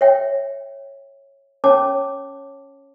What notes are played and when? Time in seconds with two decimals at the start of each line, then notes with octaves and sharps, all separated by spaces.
0.01 C#5 E5 G5
1.64 C#4 C#5 A5 D6